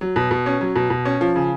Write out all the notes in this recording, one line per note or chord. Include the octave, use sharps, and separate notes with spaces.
F#3
B2
B2
C#4
F#3
B2
B2
C#4
F3
C#3